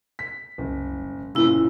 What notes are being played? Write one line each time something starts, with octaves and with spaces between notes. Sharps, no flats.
B6
F#1 C2
E1
F#1 A#2 C#3 E4 E6